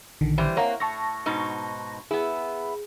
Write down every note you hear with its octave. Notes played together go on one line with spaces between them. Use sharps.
A#1 D3 D#3
E3 G3 C5
A#3 C4 C#5 F#5 A#5
A2 A5 C#6 A#6
G#2 B2 D#4
B3 E4 G#4